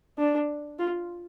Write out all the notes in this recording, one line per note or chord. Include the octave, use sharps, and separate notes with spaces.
D4
F4